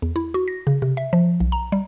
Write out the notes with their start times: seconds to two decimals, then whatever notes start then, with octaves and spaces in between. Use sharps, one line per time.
0.02 E2
0.16 E4
0.34 F#4
0.48 A#6
0.67 C#3
0.82 C3
0.97 E5
1.13 F3
1.40 B1
1.52 A#5
1.72 G3